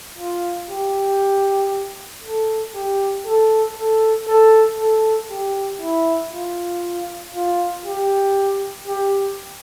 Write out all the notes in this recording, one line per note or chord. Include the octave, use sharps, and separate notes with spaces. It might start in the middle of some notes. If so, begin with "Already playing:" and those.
F4
G4
A4
G4
A4
A4
A4
A4
G4
E4
F4
F4
G4
G4